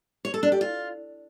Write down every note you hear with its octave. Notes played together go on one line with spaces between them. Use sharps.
C#5
A4
D4
G4
F4